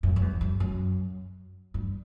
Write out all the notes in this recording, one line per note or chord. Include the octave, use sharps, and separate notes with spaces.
F#2
F#2
E2
F#2
F#2
G2